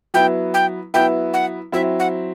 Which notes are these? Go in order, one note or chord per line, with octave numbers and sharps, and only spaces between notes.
F#3 B3 E4 G5
G5
F#3 B3 E4 G5
F#5
F#3 C4 E4 E5
F#5